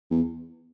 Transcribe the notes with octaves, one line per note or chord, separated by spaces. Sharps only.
E2